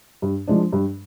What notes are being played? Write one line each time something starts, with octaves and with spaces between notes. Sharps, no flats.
G2
F3 G#3 D4
G2